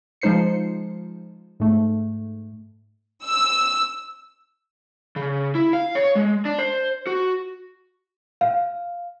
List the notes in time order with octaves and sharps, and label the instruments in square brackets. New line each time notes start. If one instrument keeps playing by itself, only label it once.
[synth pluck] F3 G#3 D#4 C5 C7 C#7
G#2 A3
[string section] E6
[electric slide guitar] C#3
E4
F5
C#5
G#3
D4
C5
F#4
[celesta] F5